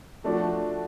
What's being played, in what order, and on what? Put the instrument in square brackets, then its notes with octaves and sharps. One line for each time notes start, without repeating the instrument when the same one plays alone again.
[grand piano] F3 A3 D4 F#4